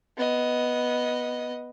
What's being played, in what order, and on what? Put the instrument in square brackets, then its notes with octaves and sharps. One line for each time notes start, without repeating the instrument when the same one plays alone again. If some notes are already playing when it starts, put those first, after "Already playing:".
[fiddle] B3 D#5